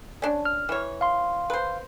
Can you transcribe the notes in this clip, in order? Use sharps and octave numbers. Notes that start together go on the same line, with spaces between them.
C#4 D4
F6
E3 C#5
F5 C6
B4 C5